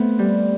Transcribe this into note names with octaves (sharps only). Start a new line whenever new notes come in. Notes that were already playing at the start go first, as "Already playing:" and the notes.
Already playing: A3 B3 C4
G3